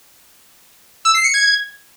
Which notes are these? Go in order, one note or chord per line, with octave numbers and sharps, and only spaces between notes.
E6
C7
C#7
G#6